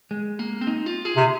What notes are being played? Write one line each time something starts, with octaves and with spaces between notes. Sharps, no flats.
G#3
A#3
C4
D#4
F4
G#4
C3